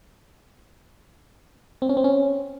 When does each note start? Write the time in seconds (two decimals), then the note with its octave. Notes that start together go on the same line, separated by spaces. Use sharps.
1.82 C4
1.89 C#4
1.97 C4
2.04 C#4